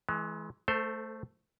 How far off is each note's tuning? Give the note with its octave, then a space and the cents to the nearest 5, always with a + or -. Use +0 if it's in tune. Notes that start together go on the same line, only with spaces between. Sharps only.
E3 -5 G#3 +35
A3 +0 A4 +35 C5 +0